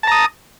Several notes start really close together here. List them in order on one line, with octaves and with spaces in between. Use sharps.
A5 A#5 D#6